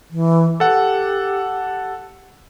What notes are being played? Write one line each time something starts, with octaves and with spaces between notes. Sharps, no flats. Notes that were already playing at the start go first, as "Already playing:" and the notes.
E3
G4 A4 F#5